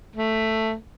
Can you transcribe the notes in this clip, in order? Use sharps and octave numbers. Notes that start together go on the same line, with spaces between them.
A3